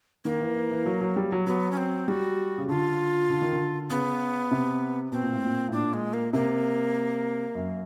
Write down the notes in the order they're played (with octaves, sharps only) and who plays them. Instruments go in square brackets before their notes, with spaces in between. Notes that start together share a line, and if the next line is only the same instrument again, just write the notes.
[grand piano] D#3 [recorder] A#3
[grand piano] E3
E3
E3
F#3
F#3
G3
F#3
[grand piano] F#3 [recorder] B3
[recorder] C#4
C4
[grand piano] G3 [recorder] F#4
[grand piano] C#3
[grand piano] D3 [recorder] F4
[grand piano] D3
D#3
D3
[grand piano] C#3 [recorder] B3
[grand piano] C3
[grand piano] B2 [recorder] C4
[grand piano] A#2
A2
A#2
A2
[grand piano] A#2 [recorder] D4
[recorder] G#3
A#3
[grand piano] C3 [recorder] A#3
[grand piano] F#2